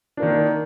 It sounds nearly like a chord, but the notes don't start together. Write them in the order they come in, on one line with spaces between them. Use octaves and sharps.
D4 A#3 D#3